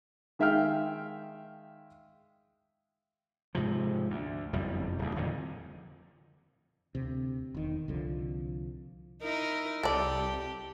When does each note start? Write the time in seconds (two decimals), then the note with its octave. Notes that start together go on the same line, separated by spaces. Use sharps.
0.39 D#3 G#3 E5 F5 G5 F6
3.55 G#2 C3 F3
4.10 D2
4.53 F#1 F2 B2 G3
4.99 D1 D2
5.16 F2 A#2 D3 D#3
6.95 D2 C3
7.55 E1 D#3
7.88 C2 D3 F3
9.23 D#4 E4 A#4
9.83 C2 G4 A4 D5